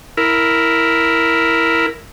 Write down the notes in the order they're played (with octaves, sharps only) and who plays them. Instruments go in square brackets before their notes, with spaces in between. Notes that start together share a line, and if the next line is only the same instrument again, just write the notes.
[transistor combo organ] E4 A#4